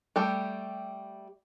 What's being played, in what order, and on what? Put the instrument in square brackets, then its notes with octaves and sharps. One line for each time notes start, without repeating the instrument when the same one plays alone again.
[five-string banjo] G3 A3 G4